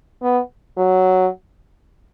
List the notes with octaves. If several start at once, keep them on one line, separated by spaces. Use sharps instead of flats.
B3
F#3